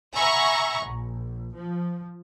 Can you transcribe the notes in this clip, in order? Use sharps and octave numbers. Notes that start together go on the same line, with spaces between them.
E5 F#5 G#5 A#5 B5 C#6
A#1
F3